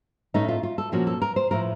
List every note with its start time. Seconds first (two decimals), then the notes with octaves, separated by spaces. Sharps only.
0.34 A2 A3 C#4 D#4
0.48 F4
0.63 F4
0.78 A4
0.92 A#2 F3 A#3 C#4 F#4
1.07 A4
1.22 A#4
1.36 C5
1.51 A2 F3 A3 A#4